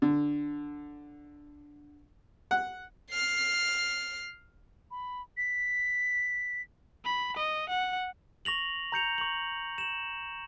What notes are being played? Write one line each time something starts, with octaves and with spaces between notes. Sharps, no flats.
D3
F#5
F6 C7
B5
B6
B5
D#5
F#5
C#6 A#6 F7 F#7
A#5 G6 C#7 F7
C#6 F#7
E7 F#7